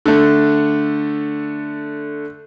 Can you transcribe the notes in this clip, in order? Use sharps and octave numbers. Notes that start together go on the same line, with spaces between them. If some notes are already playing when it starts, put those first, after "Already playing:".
D3 A3